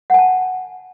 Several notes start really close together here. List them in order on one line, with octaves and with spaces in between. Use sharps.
F#5 G#5 A5